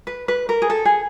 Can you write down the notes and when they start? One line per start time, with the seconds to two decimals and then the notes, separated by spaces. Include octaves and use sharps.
0.07 B4
0.28 B4
0.49 A#4
0.62 G#4
0.70 A4
0.85 G#4